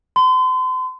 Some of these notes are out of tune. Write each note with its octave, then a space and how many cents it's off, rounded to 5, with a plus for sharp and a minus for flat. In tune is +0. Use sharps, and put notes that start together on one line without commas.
C6 -40